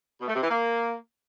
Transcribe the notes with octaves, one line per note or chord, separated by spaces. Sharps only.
B2
A3
C3
E3
A#3